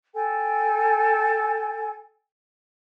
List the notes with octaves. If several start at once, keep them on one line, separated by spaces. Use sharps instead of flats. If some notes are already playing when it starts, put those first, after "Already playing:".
A4 G5 G#5